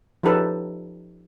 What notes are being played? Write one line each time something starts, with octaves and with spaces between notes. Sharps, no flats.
F3 C#4 D#4 G4 A4 B4